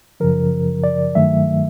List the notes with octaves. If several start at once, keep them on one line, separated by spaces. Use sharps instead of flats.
F#2 C#3 F3 A#4
D5
G2 D#3 F#3 A3 E5